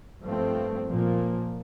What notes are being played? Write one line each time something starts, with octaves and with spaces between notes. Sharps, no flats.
G2 F3 A3 C4
A#2 F3 A#3